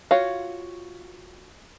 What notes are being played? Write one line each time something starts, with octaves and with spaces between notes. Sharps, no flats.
F4 F#4 C#5 F5